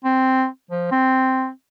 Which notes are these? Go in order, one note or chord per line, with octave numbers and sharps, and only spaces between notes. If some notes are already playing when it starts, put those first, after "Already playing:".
C4
F3
C4